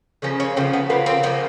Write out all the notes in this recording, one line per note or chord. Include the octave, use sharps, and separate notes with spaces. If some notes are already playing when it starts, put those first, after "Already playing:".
C#3 F3 A#3 C#4
C#4
C#3 F3 A#3 C4
B3
C#3 F3 A#3 B3
C4
C#3 F3 A#3 B3